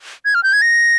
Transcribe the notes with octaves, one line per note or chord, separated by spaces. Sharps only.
G#6
F6
G6
G#6
A#6